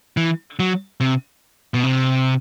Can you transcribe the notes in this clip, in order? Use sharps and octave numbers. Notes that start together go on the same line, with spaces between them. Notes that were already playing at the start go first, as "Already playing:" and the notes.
E3
F#3
C3
B2
C3